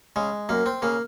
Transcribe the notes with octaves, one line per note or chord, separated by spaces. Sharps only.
C#3 G#3
F#2 A#3
C4
C#3 A#3